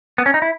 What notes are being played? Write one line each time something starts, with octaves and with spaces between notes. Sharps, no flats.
B3
C#4
D#4
E4